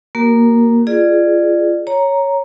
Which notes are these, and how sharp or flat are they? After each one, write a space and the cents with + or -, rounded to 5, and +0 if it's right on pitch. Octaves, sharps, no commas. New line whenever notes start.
A#3 +0 F#4 +35 A#4 +0
F4 -20 G#4 +0 D5 +25
C#5 +0 A#5 +0